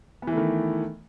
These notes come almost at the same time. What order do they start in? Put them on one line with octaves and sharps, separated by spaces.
B3 E3 A3 D#3